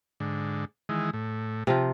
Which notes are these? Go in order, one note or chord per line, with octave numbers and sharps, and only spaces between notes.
G#2 D3
D#3 E3 G#3
A2
C3 F3 F4